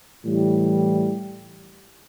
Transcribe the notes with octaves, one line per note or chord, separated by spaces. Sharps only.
A2 E3 G3